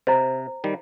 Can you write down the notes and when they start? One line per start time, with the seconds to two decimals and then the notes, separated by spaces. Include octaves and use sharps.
0.07 C3 C5 D#5 A#5
0.64 D#3 G3